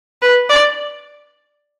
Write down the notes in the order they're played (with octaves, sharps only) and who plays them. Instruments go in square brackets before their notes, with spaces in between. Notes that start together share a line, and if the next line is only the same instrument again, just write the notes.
[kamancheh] B4
D5